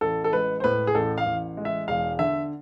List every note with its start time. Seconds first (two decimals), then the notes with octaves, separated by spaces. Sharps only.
0.01 A1 A4
0.24 A4
0.32 G#3 B4
0.60 C5
0.64 A2 B4
0.87 G#4
0.95 A1 A4
1.18 F5
1.26 A1
1.57 G#3
1.65 E5
1.88 E1 F5
2.19 D3 E5